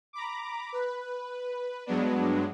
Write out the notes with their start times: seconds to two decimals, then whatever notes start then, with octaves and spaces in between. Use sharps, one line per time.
0.13 A#5 B5 D6
0.72 B4
1.86 G2 F#3 G#3 B3 D4